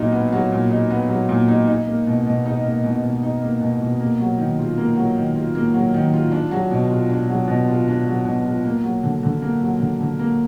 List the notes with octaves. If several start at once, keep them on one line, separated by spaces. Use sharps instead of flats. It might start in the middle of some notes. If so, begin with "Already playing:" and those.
Already playing: A#2 F#3 B3 D#4
B3
F#3
A#2
D#4
B3
F#3
A#2
D#4
D#4
A#3
B2
B2
D#4
A#3
B2
B2
D#4
A#3
B2
B2
A#3
F#3
D#3
F4
A#3
F#3
D#3
F4
A#3
F#3
D#3
F4
D4
F#3
B2
F4
D4
F#3
B2
F4
D4
F#3
B2
F4
A#3
F#3
D3
D3
A#3
F#3
D3
D3
A#3